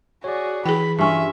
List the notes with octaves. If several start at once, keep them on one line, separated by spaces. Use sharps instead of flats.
F#4 G#4 C#5 D5
E3 G#4 G5 B5
G2 C#4 F4 E5